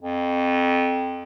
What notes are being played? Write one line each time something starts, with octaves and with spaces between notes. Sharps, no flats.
F2